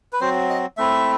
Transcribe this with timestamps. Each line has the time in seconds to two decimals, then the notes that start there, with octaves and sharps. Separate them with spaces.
0.13 B4
0.21 F#3 C4 F#4 C5
0.50 D#5
0.77 A3 C4 E4 E5